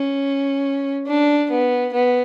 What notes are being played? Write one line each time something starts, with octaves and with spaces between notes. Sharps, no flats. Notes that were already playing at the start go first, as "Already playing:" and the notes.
Already playing: C#4
D4
B3
B3